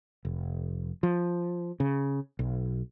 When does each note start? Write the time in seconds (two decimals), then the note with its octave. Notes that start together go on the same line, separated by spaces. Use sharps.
0.25 F1
1.03 F3
1.80 C#3
2.39 B1